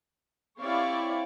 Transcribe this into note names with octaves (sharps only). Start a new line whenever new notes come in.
C4 E4 G4 C#5 D5 F5